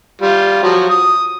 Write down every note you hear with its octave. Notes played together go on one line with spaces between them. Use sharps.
G3 F4
F3 F#3
D#6